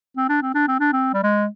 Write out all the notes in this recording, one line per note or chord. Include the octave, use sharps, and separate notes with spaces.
C4
D4
C4
D4
C4
D4
C4
G3
G#3